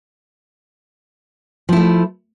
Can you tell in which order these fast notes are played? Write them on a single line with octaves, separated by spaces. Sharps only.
F3 E4 A3